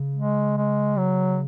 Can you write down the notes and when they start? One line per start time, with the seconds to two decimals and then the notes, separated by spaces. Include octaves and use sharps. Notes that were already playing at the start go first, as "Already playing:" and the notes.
Already playing: C#3
0.16 G#3
0.57 G#3
0.98 F#3